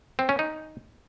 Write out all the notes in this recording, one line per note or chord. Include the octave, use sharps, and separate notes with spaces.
C4
C#4
D#4